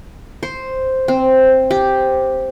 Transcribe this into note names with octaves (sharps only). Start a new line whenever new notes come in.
C5
C4
G4